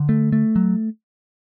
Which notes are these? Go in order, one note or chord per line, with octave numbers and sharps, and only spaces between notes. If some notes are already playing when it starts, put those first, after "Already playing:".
Already playing: D3
A3
A3
F#3